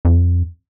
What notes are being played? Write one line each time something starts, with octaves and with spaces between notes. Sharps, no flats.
F2